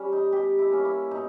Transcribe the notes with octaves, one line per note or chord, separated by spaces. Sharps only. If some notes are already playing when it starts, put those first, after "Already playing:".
Already playing: G3 C#4 G4
D#4
B2 G4
E4
A#3 C#4
E4
B2 D#4